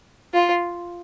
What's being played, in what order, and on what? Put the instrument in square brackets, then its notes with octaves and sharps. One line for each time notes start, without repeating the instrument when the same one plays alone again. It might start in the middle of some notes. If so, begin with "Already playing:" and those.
[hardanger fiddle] F4